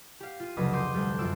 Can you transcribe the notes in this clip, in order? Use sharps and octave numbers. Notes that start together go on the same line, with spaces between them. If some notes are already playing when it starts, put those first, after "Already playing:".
G4 F5
F4 D#7
F1 C#2 F#3 D4 B5 D#6
C6 D6 D#6 G6
D2 G3 G6
F#2 F4 E6 D7